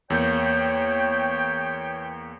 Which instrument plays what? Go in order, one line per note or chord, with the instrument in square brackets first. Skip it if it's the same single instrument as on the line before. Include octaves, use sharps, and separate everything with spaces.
[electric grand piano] E2 A#3 G6 [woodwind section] C#5 G5